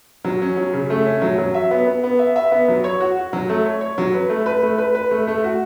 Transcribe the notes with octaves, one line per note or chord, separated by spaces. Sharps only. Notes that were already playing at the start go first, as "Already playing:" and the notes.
F#3
C#4
F#3
C#3
A3
C#4
F#3
F#3
E5
B3
B3
B3
E5
E5
B3
F#3
C#5
F#4
F#4
F#3
A3
C#5
C#5
F#3
B4
A3
B4
A3
B4
B4
A3
A3
F#4